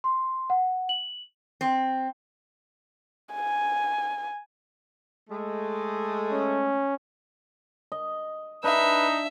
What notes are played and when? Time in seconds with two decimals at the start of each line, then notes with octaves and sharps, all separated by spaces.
0.04 C6
0.50 F#5
0.89 F#7
1.61 C4
3.34 G#5
5.29 G#3 A3
6.32 C#4
7.92 D#5
8.64 D4 D#4 B4 E5